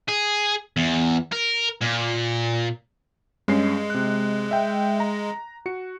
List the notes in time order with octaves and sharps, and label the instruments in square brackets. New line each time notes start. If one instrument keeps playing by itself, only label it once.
[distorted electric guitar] G#4
E2
A#4
A#2
[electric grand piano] G2 C#4 C7 [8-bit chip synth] G#3
[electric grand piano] C3 F#6
E5 G5
A#5
F#4 C#7